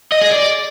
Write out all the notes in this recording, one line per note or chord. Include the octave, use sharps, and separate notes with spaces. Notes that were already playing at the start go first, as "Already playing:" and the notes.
D#5
G#4
D5